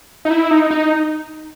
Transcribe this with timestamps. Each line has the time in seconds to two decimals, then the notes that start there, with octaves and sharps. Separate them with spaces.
0.25 D#4
0.30 E4
0.51 D#4
0.71 D#4